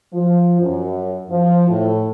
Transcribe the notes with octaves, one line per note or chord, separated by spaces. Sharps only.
F3
F#2
F3
A2